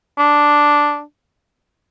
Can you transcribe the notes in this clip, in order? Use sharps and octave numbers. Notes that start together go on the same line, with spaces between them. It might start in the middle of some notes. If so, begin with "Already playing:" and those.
D4